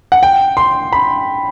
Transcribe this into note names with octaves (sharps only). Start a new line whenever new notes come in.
F#5
G5
C6
B5